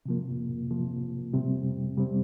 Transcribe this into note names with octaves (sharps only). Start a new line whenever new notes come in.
C3 F3 A#3
C3 F3 A#3
C3 G3 C4
C3 G3 C4